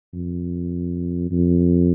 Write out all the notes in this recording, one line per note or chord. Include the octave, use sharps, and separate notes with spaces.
F2
F2